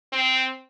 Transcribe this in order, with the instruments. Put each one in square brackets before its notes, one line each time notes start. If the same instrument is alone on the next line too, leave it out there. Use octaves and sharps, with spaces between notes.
[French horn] C4